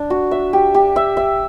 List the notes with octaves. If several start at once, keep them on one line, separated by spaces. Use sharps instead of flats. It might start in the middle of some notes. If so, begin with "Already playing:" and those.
Already playing: D4
F#4
E5
G4
G4
E5
E5